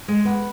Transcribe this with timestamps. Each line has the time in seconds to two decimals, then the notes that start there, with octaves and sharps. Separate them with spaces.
0.08 G#3
0.25 B3